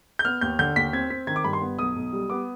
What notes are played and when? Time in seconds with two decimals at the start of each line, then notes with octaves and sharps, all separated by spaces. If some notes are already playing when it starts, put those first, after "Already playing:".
0.19 G6
0.25 B3 F6
0.41 D#2 G6
0.59 D3 G6
0.76 D#2 B6
0.93 C4 G#6
1.10 C4 B6
1.27 D#3 G#6
1.36 D6
1.44 G2 B5
1.53 C6
1.62 B3
1.79 B1 D#6
1.96 B1
2.13 G3
2.30 B3 D6